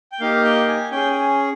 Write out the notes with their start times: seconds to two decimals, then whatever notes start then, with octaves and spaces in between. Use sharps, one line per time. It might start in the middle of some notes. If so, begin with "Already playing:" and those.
0.12 G5
0.20 A#3 D#4 G4 F5
0.44 G5
0.68 G#5
0.92 C#4 G#4 G5